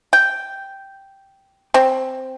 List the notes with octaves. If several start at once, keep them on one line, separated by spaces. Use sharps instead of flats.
G5
C4